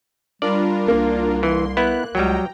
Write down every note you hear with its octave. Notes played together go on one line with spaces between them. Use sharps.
G3 D4 F4 A#4 D5
C2 A#3
E3 C6
B3 E4 F#6
C#2 F#3 G3 G5 A#5